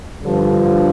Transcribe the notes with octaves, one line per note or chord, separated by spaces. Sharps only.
G2 D3 F3